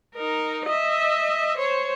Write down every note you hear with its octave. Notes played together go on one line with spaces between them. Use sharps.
D#4 A#4
D#5 E5
C5 C#5